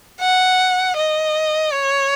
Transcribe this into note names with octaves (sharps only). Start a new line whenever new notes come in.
F#5
D#5
C#5